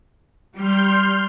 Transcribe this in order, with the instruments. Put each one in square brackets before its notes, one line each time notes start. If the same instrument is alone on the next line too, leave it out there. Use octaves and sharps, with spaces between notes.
[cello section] G3 [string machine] C6 F6 G6